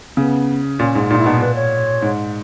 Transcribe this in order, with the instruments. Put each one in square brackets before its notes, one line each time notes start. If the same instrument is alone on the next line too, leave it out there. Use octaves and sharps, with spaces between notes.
[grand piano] C#3 [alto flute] B3
[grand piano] A#2 [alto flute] C#4
[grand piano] G#2
[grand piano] A#2 [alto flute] D#4
[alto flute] E4
[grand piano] B2 [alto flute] D#4
[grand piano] A#2 [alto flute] B4
[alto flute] C#5
[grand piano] G#2